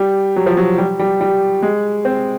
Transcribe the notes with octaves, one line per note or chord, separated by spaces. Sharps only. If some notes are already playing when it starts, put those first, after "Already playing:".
Already playing: G3
F#3
F3
F#3
G3
G3
G3
G#3
C4